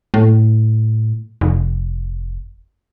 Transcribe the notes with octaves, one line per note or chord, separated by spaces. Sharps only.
A2
F1